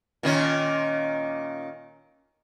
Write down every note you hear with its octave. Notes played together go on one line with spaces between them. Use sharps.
A#2 D#3 C#4